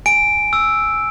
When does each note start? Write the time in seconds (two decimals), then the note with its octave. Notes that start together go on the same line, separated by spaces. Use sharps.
0.06 G#5 D7
0.53 E6